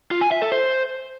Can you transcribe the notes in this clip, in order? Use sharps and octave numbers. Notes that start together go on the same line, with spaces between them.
F4
G#5
E5
A4
C5